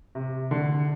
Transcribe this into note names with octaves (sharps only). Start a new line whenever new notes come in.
C3
D3